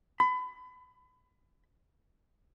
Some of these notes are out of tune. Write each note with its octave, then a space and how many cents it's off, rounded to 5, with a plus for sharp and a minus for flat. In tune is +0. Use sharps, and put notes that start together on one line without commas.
B5 +30